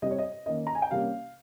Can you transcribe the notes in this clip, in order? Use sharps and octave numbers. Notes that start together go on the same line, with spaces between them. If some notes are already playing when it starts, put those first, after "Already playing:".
C3 G3 C4 D#5
C#5
D#5
D#3 A#3 C#4 D#5
A#5
G#5
G5
C3 G3 A#3 C#4 F5